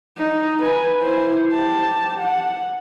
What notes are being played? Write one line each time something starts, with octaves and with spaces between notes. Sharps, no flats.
D#4
B4 G#5
E4 C5
G4 A5
F#5